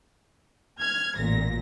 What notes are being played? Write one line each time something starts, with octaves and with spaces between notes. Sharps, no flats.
F6 G#6
A1 A#2 A#6